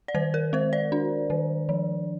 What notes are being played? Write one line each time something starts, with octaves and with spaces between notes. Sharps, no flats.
D5
D#3 C5
A#4
G#3 C5
D5
D4
D#3
F3